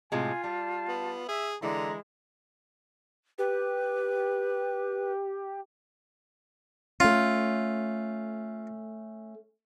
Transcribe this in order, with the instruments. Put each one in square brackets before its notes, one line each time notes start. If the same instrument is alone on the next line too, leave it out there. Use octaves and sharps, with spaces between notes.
[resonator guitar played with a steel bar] A2 C3 G#3 [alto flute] F4 [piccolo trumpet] G#5
[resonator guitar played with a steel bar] G3 [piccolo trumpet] A5
[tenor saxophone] B3
[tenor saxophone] G#4 [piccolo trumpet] E5
[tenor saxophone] D3 [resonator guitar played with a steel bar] E3 E4 [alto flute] G#3 [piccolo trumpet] A#5
[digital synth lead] G4 [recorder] B4
[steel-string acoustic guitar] A3 C#4 [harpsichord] F4